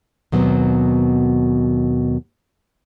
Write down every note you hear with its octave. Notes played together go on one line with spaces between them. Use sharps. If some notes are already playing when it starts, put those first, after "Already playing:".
D#2 B2 F#3 G3 B3 C4